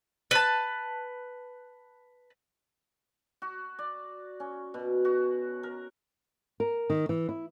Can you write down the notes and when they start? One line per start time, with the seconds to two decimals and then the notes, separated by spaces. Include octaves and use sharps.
0.31 B4 A5
3.42 F#4
3.79 D5
4.40 C#4
4.74 B2
5.05 F#4
5.63 A#4
6.60 A#4
6.90 D#3
7.09 E3
7.29 E4